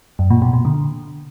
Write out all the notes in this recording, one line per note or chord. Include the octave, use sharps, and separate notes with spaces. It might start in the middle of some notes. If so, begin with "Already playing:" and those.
F#2
A#2
B2
B2
D3